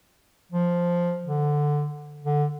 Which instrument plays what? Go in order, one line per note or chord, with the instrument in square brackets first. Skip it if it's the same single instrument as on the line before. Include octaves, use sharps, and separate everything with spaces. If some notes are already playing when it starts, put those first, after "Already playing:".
[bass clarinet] F3
D3
D3